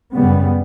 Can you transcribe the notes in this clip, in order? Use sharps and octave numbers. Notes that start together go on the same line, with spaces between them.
F#2 C#3 G3 B3